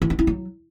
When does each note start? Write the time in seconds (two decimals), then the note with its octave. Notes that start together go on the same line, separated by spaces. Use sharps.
0.02 E3
0.10 D#4
0.19 E4
0.27 F#3